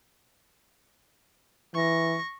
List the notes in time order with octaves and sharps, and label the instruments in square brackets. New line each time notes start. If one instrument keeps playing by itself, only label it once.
[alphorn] E3 [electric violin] C#6 A#6